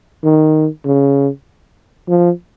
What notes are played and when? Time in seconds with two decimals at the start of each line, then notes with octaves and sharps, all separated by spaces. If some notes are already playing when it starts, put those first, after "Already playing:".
0.24 D#3
0.85 C#3
2.08 F3